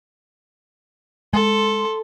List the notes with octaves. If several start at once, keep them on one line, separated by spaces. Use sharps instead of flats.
G#3 A4 C6